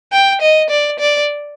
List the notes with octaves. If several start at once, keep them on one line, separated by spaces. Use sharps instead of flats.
G5
D#5
D5
D5